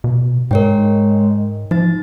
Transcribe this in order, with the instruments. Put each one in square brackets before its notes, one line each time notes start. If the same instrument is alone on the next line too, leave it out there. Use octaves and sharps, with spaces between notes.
[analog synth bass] B2
[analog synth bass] G#2 [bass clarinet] G#3 [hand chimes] A#4 C#5 G5
[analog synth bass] F3 [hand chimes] D#4 A6